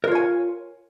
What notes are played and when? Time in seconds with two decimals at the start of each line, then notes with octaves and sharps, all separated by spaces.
0.04 A#4
0.08 F4
0.11 C#5
0.15 G#5